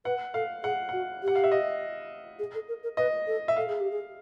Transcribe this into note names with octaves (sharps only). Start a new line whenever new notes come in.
B4 F#5
A4 F5
G#4 F#5
F#4 F#5
G4
F#5
F5
E5
D#5
G#4
A4
A#4
A#4
B4 D#5
A4
E5
A4 F5
G#4
G4
G#4